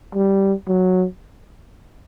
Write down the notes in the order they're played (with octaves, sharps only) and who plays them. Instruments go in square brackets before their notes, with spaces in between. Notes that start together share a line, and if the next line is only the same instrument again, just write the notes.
[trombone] G3
F#3